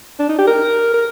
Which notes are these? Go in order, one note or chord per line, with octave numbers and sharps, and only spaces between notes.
D4
D#4
G4
A#4
A#4